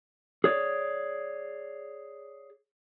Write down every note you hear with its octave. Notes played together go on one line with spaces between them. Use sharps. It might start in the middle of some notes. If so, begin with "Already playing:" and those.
G#4 C#5 D5